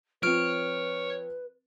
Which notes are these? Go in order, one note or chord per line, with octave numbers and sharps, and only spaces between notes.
F3 C4 B4 C#5 F6 D7